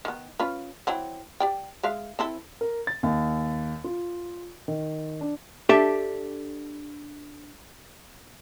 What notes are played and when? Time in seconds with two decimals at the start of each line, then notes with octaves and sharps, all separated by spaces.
0.05 D#3 B3
0.39 C#4 F4 B4
0.87 E3 F#3 C4
1.40 G4 D5 G5
1.83 G#3 E5 F5
2.19 C4 E4 A4
2.61 A#4
2.87 A6
3.03 D#2
3.84 F4
4.68 D#3
5.21 D4
5.69 D4 G4 A4 E5 A5